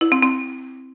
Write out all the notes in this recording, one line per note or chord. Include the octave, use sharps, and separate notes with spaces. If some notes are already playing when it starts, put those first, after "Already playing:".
E4
C4
C4